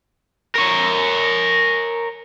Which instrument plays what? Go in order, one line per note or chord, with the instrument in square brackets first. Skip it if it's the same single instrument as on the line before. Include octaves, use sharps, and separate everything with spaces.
[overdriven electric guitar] A#4 C#5